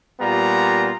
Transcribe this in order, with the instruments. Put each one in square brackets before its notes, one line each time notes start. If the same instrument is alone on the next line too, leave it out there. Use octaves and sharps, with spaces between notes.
[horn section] A#2 G3 B3 F4 A#5